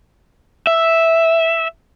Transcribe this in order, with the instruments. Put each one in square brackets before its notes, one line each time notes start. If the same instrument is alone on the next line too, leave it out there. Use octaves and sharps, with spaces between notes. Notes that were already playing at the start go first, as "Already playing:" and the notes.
[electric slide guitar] E5